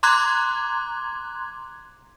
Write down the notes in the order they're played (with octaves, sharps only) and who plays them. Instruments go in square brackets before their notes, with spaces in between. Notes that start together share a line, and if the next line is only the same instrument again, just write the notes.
[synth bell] A#5 C6 D6 F#6 G#6